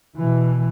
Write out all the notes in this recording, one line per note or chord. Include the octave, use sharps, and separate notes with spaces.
B2 E3